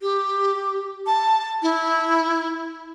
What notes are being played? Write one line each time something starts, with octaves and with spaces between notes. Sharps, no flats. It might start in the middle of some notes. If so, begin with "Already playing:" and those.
G4
A5
E4